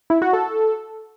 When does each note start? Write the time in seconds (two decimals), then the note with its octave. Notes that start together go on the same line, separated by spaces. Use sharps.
0.10 E4
0.22 F#4
0.33 A4